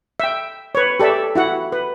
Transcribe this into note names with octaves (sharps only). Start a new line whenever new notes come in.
E5 G5
B4 C#5
G4 A4 D5 E5
E4 F#4 F#5
B4